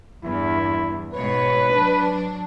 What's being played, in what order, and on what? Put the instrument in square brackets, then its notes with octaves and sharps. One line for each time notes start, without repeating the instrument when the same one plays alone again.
[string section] E2 G2 [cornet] E4
[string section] G#2 B2 C#5 [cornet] B4
[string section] F#3 D4